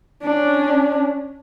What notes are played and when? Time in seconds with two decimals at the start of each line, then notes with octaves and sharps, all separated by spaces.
0.23 C#4 D4